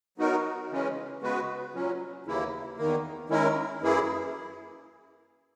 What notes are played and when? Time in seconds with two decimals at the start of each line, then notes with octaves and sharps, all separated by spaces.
0.18 F#3 B3 D#4 F#4 A#4
0.69 C#3 E3 G#3 C#4
1.22 C#3 G#3 B3 F#4 B4
1.73 A#2 F#3 C#4
2.26 D#2 C#3 E3 A#3 E4
2.77 E2 D#3 A#3
3.29 D#3 G#3 C#4 E4 A#4
3.81 F#2 E3 A#3 E4 G#4